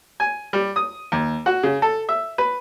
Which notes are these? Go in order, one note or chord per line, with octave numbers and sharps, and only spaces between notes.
G#5
G3
D#6
D#2
F#4
C#3
A4
E5
B4